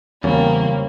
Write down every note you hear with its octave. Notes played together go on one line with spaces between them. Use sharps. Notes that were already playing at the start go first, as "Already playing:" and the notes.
E2 C#3 G3 A#3 C4 C#4